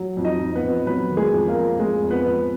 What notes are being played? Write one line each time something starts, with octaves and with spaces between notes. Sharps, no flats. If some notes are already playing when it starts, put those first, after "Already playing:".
Already playing: F#3
F2
D#4 D#5
F2
B3 B4
F2
F#3 B3 B4
D#3
G#3 G#4
F2
A#3 A#4
F2
F2 G#3 G#4
F2
B3 B4
F2